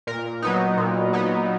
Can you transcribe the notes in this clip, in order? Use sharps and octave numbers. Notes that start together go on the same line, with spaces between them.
A#2 A#4
F#3 B3 D#4
A#2
F#3 B3 D#4